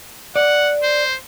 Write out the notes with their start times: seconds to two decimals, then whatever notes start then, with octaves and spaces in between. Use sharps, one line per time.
0.36 D5 F#5
0.82 C5